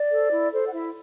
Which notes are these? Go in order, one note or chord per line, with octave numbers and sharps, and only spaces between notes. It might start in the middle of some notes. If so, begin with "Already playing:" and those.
Already playing: D5
A4 C5
E4
A4 C5
F#5
E4 E5